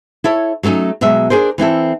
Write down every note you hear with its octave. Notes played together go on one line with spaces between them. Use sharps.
E4 A4 C#5
F#3 A3 C4 C#4 D#4
B2 F#3 G#3 E5
D4 G#4 A#4 C5
E3 C4 E4 A4